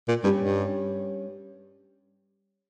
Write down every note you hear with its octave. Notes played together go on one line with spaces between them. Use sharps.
A#2
G2 G3 C#4 G4
G2